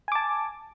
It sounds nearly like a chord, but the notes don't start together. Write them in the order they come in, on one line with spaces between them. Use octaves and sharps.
G#5 D6 A5